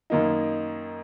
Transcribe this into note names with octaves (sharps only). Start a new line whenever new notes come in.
F#2 D#3 A#3 D#4